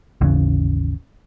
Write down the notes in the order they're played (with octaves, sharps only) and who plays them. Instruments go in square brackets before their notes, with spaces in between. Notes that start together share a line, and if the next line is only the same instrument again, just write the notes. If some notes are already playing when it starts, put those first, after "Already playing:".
[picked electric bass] G#1 D#2 C#3 E3